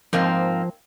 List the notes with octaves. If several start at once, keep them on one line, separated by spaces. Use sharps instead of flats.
G#2 F3 A#3 C4